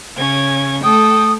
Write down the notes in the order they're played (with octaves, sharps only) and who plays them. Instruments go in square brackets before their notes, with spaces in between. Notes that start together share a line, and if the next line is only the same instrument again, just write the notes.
[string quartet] C#3 C#4 G#6
[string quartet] A3 A4 G5 [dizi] D#6